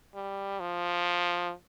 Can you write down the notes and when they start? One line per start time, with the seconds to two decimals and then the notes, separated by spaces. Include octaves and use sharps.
0.15 G3
0.60 F3